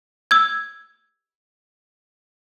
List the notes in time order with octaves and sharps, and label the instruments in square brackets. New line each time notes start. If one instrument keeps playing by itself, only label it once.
[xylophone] E6 G#6